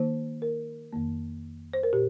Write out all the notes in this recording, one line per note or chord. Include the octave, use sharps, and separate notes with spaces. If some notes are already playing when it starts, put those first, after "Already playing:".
Already playing: D#3 A#3 D#4 C5
A#4
F2 D#3 A#3
C5
A#4
A#2 G4